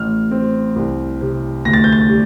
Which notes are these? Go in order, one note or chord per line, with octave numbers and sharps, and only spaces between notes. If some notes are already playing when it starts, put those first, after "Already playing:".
Already playing: A1 F6
C4
C2
C3
D2 A#6
A6
G6
A6
G3